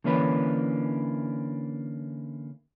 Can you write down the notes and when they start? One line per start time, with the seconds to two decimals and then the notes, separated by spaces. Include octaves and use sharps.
0.04 D3 E3 A#3 C#4 D4 B4